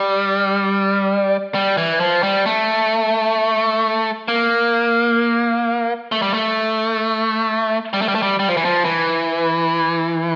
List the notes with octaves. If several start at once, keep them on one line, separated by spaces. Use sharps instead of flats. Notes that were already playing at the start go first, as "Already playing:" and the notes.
Already playing: G3
G3
E3
F3
G3
A3
A#3
A3
G3
A3
G3
A3
G3
A3
G3
G3
F3
E3
F3
E3